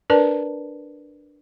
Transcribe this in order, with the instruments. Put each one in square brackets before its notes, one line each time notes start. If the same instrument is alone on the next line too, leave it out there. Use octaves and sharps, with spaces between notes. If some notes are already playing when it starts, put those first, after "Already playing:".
[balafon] D4 A#4 B4 D5 A5